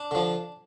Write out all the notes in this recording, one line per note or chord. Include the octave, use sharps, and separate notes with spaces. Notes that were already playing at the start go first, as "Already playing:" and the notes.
Already playing: D4
D3 F3